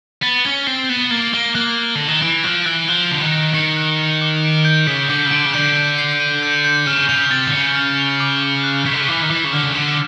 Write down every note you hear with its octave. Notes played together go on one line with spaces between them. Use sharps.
B3 A6
C#4 G7
C4 C7
B3 E7
A#3 A6
A#3 G7
A#3 F#6
F#6
D3 A#6
D#3
E3 D7
F3 F#6
E3 F#6
F3 F#6
D3 F7
D#3
A#6
D#3 C#7
F#6
F7
D6
D7
G6
C#3 B6
D3 D6
C#3
D3 D7
C#3
D3 G6
G6
C7
D#7
G6
G6
C#3 F6
C#3 F7
C3 A6
D3
C#3 C#7
F6
F7
D6
D6
F#6
C#3 B6
D3
C#3
E3 D6
D#3
E3 D6
C#3
D3 F6
C#3
D3 E7